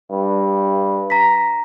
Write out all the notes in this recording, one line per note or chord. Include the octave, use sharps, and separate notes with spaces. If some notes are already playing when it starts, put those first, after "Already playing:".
G2
A#5 A#6 B6